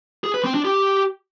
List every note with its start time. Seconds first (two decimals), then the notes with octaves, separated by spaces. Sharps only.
0.24 G#4
0.34 B4
0.44 C4
0.54 D4
0.65 G4